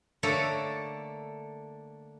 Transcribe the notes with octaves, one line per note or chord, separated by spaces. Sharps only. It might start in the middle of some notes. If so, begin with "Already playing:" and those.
D3 A3 A#3 A4 C#5